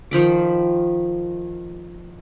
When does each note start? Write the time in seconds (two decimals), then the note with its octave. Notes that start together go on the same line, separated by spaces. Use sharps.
0.11 D#3 F3 B5 D6